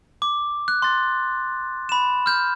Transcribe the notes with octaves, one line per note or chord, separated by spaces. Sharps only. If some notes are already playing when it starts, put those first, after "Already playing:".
D6
F#6
C6 A6
B5 E7
F6 G6